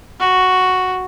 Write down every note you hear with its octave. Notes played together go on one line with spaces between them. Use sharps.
F#4